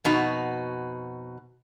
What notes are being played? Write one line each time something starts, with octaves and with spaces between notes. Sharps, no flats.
F2 B2 D#4 F#4